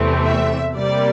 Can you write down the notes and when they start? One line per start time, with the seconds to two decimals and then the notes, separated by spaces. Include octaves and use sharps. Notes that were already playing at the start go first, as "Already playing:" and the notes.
Already playing: E2 C3 E3 A3 C4
0.25 E5
0.75 C3 G3 A#3 D5